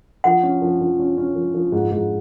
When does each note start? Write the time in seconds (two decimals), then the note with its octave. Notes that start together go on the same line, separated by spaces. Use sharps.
0.24 F3 F#5
0.43 C#4
0.62 F3
0.81 F3
0.99 C#4
1.18 C#4
1.35 F3
1.54 F3
1.72 G#2
1.92 G#2